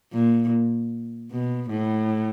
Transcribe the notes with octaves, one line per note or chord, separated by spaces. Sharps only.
A#2
B2
A2